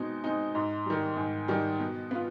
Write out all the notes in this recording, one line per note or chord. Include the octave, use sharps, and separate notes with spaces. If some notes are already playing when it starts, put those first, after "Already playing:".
Already playing: B2 G#3 C4 D#4
G#3 C4 D#4
G#2
D#3 G3
G#2
D#3 G3
B2
B3 F4